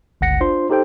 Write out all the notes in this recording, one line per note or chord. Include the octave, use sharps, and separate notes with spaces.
G1 C#2 F#5 A#6 C#7
D4 F4 C5 C6
D#4 G4 A4 C5 G5